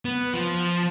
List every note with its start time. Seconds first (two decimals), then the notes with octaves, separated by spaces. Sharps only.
0.05 B3
0.34 F3